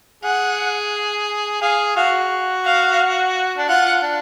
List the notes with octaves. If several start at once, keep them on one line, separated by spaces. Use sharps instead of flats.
G#4 F#5
G#4 F5
F#4 F5
F5
D4
F4 F#5
D4